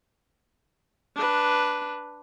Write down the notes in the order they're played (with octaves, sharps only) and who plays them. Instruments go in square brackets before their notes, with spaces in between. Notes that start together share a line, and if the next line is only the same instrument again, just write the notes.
[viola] D4 B4